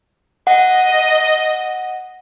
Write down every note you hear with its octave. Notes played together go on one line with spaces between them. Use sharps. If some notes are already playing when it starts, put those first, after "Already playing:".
D#5 F#5